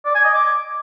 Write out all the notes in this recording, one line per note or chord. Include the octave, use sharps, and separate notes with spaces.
D5
G#5
D#5
D6